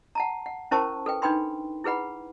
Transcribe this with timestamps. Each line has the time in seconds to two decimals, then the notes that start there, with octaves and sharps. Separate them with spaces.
0.15 F#5 A5 A#5
0.46 F#5
0.71 C#4 E4 A#4 C5 A5 C#6
1.06 A4 B4 G5
1.22 D4 D#4 B4 G5 B5 C6
1.84 E4 G#4 B4 F#5 B5